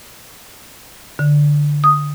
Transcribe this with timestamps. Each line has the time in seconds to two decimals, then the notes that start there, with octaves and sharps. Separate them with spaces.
1.19 D3
1.84 D#6